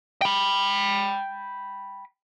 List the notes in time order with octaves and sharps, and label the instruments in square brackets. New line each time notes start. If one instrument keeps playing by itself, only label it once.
[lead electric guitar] G5 B5